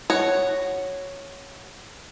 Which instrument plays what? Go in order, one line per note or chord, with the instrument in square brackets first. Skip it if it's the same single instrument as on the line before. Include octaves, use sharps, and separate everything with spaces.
[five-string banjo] F#4 C#5